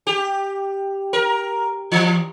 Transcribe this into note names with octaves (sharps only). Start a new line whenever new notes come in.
G4
A#4
E3